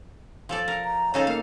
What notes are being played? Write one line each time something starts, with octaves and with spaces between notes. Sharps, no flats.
F3 A4 D5
A#4
A#5
C#3 D#4 A4 C#5
A#3 F5